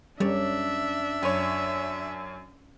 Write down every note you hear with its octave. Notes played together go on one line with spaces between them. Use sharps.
F#2 G3 D4 C#5 D5 E5
F#2 C#5 G#5